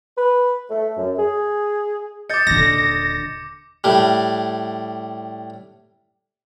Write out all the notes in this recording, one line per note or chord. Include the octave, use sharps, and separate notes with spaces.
B4
A3
F#2
G#4
D#5 D6 G6 A6 C#7
D#1 D3 A#6
A2 G3